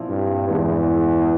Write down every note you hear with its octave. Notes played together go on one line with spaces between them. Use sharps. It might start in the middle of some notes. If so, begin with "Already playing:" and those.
Already playing: A#2 F3 C4 E4
G2
E2 G2 E3 G#3